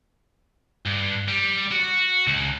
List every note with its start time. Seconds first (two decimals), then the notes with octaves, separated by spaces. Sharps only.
0.86 G2
1.29 G3
1.72 F#4
2.27 C#2